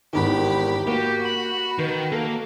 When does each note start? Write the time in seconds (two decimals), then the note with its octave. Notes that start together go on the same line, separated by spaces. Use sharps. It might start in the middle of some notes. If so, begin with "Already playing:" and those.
0.13 G#1 E2 D#3 G4 B5
0.87 A#3 F#4 G4
1.26 B5
1.79 D#3 B4
2.12 A#3 A4